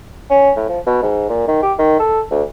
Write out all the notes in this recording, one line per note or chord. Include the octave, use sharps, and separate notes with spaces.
C#4
A2
F3
B2
G#2
A#2
D#3
G4
D#3
A4
D2